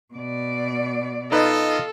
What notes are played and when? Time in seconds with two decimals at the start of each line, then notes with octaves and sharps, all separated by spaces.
0.14 B2 D5
1.32 D#4 F4 A4 B4 D#5